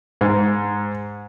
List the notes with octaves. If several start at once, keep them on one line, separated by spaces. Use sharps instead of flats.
G#2